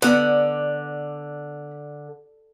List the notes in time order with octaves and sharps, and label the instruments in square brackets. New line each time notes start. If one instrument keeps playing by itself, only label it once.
[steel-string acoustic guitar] D3 [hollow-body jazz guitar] B3 [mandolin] D5